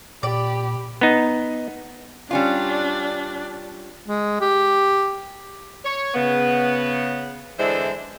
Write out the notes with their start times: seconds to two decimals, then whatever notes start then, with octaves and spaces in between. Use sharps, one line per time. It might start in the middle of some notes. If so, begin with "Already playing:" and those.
0.23 A#2 G4 D5 B5
1.01 B3 D#4
2.31 G3 C#4 D4 F4
4.06 G#3
4.41 G4
5.85 C#5
6.14 C#3 B3
7.59 D3 E3 G#3 D4 E4 C5